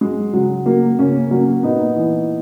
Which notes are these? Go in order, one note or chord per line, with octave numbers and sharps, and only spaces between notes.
F#3 G#3
C#3 F#3
F#3 A#3
C#3 A#3 C#4
F#3 A#3
A#2 B3 D#4
E3